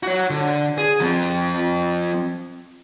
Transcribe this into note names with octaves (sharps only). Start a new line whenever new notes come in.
F#4 C#5
D3
G#4
F3 C4